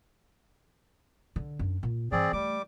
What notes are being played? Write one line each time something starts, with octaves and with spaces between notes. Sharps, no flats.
D3
F#2 D4
A#2
G2 E3 C4 G#4 D5
G3 A3 D6